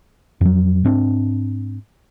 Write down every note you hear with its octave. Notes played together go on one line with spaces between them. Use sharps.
F2 F#3
G#2 C4 D4